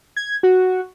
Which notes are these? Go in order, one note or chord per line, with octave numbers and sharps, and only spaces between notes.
G#6
F#4